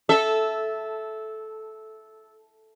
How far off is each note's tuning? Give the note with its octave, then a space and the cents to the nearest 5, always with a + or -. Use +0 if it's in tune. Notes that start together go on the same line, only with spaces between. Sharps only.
A4 -10 E5 +0